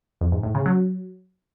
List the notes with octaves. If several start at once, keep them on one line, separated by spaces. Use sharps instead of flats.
F2
G#2
A2
C#3
F#3